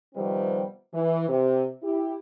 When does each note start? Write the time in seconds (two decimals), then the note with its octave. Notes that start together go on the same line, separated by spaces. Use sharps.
0.14 C3 D#3 F3 G3 B3 C4
0.93 E3
1.28 C3
1.82 E4 G4